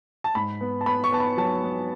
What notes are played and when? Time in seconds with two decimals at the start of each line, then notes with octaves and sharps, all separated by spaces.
0.24 A5
0.35 G#2 B5
0.61 B3
0.81 A5
0.86 B3 B5
1.04 C#6
1.12 B3 A5
1.20 B5
1.37 F#3 A5
1.63 B3